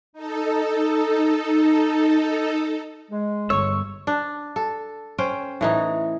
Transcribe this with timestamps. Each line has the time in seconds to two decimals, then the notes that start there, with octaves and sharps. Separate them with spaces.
0.13 D#4 A4
3.11 G#3
3.50 G1 C#5 C#6 E6
4.07 D4
4.56 A4
5.18 C#4 C5 G5
5.61 A2 E3 D#4